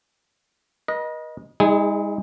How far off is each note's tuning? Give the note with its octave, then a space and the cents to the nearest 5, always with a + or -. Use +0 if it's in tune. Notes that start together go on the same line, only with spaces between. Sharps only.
B4 -45 D#5 +0
G#3 -35 D#4 +35 G#4 +0